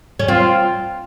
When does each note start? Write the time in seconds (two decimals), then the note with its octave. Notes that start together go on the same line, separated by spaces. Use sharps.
0.19 C#4
0.28 C4 F4